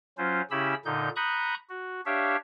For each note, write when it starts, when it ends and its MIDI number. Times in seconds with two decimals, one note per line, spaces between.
0.18 0.42 54
0.18 0.42 61
0.18 0.42 65
0.18 0.42 72
0.51 0.74 49
0.51 0.74 61
0.51 0.74 64
0.51 0.74 67
0.51 0.74 83
0.51 0.74 88
0.85 1.09 46
0.85 1.09 50
0.85 1.09 63
0.85 1.09 91
1.16 1.54 82
1.16 1.54 83
1.16 1.54 85
1.16 1.54 87
1.16 1.54 90
1.16 1.54 91
1.69 2.01 66
2.06 2.37 62
2.06 2.37 67
2.06 2.37 73
2.06 2.37 76
2.06 2.37 77